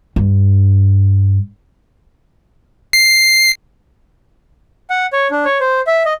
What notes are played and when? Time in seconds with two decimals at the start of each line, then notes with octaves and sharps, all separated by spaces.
0.16 G2
2.93 C7
4.90 F#5
5.13 C#5
5.31 D4
5.45 C#5
5.60 C5
5.87 E5
6.06 D#5